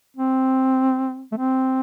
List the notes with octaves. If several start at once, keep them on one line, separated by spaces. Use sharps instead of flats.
C4
A3
C4